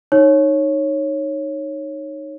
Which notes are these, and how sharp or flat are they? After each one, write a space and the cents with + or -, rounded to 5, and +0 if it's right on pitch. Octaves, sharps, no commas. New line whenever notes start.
D#4 -15 C#5 -10